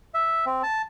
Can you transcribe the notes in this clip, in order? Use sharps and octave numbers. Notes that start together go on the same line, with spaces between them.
E5
C4
A5